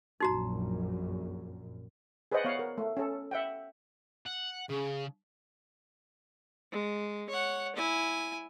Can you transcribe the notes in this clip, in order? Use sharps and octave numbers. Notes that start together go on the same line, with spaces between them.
A#1 F#2 D#4 F#4 A#5
G#4 B4 C5 D5 D#5 F#5
B3 C#5 F5 F#5
A#4
A3
C#4 A4
E5 F#5 G5
F#5
C#3 G#4
G#3
C#5 F#5
E4 G#5